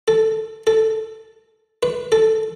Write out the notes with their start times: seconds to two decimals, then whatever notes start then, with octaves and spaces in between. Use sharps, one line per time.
0.08 A4
0.67 A4
1.83 B4
2.12 A4